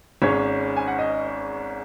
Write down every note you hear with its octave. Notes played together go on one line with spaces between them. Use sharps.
G#1 G#2 G#3 C#4 C#5
G#5
F#5
D#5